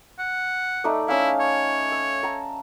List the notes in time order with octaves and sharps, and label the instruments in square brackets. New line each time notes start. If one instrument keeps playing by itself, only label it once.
[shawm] F#5
[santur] A3 D#4 D5
[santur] A3 C#4 F5 [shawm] E4
[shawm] C#5
[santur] E6
A5 A#5